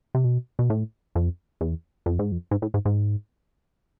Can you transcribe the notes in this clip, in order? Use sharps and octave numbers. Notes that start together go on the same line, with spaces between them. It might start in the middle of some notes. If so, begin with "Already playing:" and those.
C3
B2
B2
A2
F2
E2
F2
G#2
F2
G#2
A2
G#2
G#2